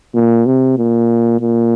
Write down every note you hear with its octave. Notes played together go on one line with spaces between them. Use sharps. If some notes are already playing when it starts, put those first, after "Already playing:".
A#2
C3
A#2
A#2